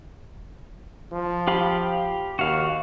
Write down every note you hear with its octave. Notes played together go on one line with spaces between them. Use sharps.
F3
G4 F5 B5
D#2 F#4 F5